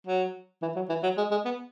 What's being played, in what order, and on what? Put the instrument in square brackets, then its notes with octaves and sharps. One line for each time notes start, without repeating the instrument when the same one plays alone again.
[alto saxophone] F#3
E3
F#3
E3
F#3
G#3
G#3
B3